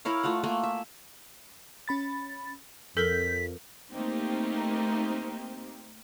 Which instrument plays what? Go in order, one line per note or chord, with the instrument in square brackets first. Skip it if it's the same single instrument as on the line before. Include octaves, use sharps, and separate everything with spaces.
[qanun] E4 A#4 C#5 F5
A3 F4 F5 F#5
A3 A#3 G#5
E5
[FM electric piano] C#4 B5 A6
[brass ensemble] F2 [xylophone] A4 A#4 [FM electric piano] G6 [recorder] B6
[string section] A3 A#3 C4 D#4 G4 C5